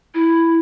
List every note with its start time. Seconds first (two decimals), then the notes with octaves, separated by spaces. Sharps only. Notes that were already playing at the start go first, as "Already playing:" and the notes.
0.15 E4